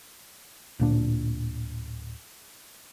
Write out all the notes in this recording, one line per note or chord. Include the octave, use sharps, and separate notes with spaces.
D1 A#2 D4